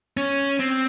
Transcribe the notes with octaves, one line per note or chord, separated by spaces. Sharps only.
C#4
C4